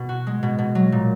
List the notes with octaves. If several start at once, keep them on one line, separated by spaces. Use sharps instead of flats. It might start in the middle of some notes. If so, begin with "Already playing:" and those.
Already playing: B2
F#4
G#3
B2
B2
F#3
A#2